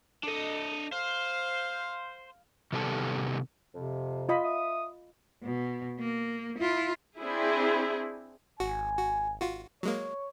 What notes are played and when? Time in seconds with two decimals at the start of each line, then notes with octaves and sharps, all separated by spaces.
0.24 D4 A4 D#5
0.92 C5 F5
2.73 C3 D#3 G3 B3 A4 A5
3.74 F2 C3
4.29 F4 D#5 B5
4.44 E5 D#6
5.43 B2
6.00 A#3
6.58 E4 F4
7.21 C4 D4 E4 G#4
8.60 G#1 F#4 G#5
8.98 F#4
9.40 F4 F#4
9.83 F#3 G#3 A#3 C#5